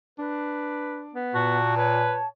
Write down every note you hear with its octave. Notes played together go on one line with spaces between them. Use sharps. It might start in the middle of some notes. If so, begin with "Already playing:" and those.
D4 B4
B3
A#2 F#4 A5
B4 C#5